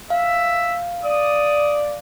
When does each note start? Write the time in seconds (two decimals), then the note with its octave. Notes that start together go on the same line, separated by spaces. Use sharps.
0.10 E5 F5
1.04 D5 D#6